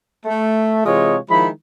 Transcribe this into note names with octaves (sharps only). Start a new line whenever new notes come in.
A3
C3 E3 G#3 F4 C#5 D#5
D#3 F3 G#3 E4 B5